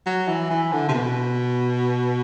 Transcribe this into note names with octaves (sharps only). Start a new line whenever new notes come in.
F#3
E3
E3
D3
C3
B2